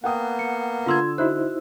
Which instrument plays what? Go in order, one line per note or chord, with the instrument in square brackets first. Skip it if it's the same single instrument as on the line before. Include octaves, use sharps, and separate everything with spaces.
[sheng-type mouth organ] A#3 B3 [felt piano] F#5 G5 D#6
[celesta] C#7
[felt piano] D3 E6 [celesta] F4 C6 G#6
[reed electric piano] D#4 E4 C5 [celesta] F#4 F#6